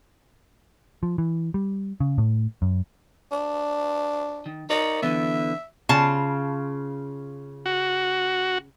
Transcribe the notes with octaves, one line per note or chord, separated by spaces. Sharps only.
F3
E3
G3
C#3
A2
F#2
D4
D#3
D#4 A#4 C#5 D5
D3 E3 B3 E5
C#3 F4 A5
F#4